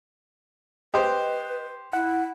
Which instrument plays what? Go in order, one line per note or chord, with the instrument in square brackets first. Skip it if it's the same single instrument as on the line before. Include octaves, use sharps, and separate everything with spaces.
[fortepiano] G4 C5 [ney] B4 [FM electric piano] D#5
[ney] E4 [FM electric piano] F#5